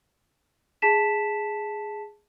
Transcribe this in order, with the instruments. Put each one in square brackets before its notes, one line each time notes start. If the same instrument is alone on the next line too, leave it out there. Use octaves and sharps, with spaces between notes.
[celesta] G#4 A5 B6 E7